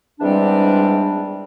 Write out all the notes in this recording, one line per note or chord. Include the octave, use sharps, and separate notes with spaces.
E2 G#2 G3 G#3 C4 D4